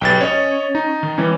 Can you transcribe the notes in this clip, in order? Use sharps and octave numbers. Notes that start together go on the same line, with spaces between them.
B1 G4 B4 G5 A6
C#4 C#5 D#5
D#4
D#3
E3 G3 C#4